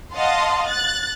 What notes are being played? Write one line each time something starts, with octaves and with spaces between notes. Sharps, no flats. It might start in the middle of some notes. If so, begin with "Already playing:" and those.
D#5 F5 F#5 A5 C6
F#6 A6